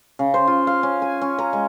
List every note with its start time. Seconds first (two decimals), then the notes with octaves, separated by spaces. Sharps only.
0.19 C#3
0.34 C5
0.47 F4
0.67 F5
0.83 C#4
1.02 G#5
1.21 C#4
1.39 A#5
1.53 G#3